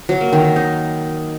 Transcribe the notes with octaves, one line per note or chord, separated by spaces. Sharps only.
F#3
A#3
D#3
D#3
D#4